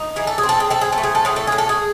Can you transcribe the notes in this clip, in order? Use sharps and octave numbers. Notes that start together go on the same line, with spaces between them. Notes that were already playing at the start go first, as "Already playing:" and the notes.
Already playing: D#4
E3 G#4
A4
G#4
C4
A4
G#4
C4 A4
G#4
A4
A3
G#4
A4
A2 G#4
A4
A2 G#4
A4
G#4